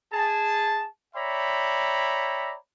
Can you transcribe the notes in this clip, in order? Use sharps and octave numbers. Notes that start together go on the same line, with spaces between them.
G#4 A5
C#5 D5 E5 G5 A#5 B5